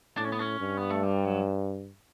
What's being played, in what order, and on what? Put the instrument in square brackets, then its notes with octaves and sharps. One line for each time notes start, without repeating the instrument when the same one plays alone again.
[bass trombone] A2 [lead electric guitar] D4
[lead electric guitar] C#4
B3
C#4
[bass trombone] G2
[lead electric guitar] B3
A3
G3
F#3